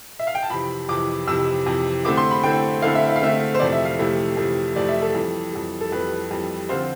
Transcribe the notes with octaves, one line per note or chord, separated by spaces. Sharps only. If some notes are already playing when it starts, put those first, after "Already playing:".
E5
F5
G5
A5
F2 C3 E3 B5
F2 C3 E3 D6
F2 C3 E3 E6
F2 C3 E3
D3 A3 C4 E4 D6
C6
B5
D3 A3 C4 E4 G5
D3 A3 C4 E4 F5
E5
E5
F5
D3 A3 C4 E4 E5
C5
F2 C3 E3 A3 E4 D5
E5
F5
F2 C3 E3 A3 E4
F2 C3 E3 A3 E4
F2 C3 E3 A3 E4 D5
E5
A4
F2 E3 G3
F2 E3 G3
A4
F2 E3 G3 B4
F2 E3 G3
D3 F3 C4 F4 C5